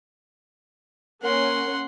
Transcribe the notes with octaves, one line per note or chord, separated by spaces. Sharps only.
A#3 C#4 A#4 F#5 C6